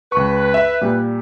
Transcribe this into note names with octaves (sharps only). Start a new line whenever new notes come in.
C#2 B4 C#6
E5
A#2 G3